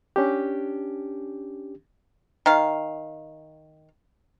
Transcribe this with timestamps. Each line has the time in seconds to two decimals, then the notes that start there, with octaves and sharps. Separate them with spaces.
0.16 C#4 D4 G4
2.46 D#3 F5